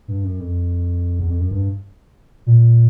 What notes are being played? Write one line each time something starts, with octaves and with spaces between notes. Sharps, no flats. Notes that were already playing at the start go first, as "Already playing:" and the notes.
G2
F#2
F2
E2
F2
F#2
G2
A#2